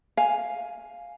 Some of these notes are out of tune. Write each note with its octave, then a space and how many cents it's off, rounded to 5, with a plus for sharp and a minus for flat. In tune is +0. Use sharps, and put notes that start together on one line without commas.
F5 +5 G#5 +0